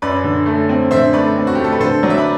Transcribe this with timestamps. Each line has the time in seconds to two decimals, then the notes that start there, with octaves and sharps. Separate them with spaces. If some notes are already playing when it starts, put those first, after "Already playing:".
0.02 F#2 B4 D5
0.24 D3
0.46 A3
0.69 C4
0.91 D3 C5 E5
1.13 A3 B4 D5
1.36 C4
1.47 F#4
1.55 A3 G4
1.64 A4
1.72 B4
1.80 D3 A4 C5
2.03 F#3 D5
2.10 E5
2.18 B4 D5